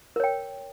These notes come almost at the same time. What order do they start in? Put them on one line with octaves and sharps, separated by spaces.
A#4 C#5 G5